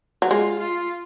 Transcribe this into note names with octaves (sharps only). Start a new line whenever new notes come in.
F#3
G#3 F4
F4